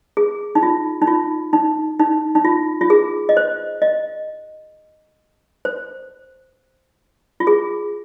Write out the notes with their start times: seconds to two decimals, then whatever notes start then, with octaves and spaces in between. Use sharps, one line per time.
0.17 G#4
0.55 D#4
0.63 F4
1.02 D#4
1.07 F4
1.53 D#4
1.99 D#4
2.35 D#4
2.45 F4
2.81 F4
2.90 G#4
3.29 D#5
3.37 C5
3.82 D#5
5.65 C5
7.40 F4
7.47 G#4